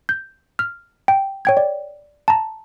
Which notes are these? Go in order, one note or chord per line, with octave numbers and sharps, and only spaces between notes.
G6
F6
G5
C#5 G5 G#6
D5
A5 A#5